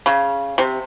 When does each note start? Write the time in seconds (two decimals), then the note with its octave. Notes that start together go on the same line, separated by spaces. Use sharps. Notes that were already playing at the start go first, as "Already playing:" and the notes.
0.06 C#3
0.58 C3